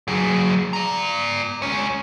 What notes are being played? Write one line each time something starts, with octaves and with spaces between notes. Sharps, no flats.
F#3 G#4
D5 A#5
G#3 C#5